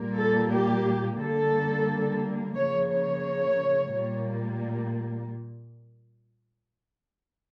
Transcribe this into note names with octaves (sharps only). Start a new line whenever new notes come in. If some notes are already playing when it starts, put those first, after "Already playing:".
Already playing: A#2 G3 A#3
A4
G4
D3 G3 A#3 A4
C#3 F3 A#3 C#5
C#5
A#2 G3 A#3